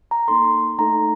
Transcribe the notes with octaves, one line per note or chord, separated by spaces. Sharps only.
A#5
A#3 D#4 A4 C6
A3 D#4 A4 A#5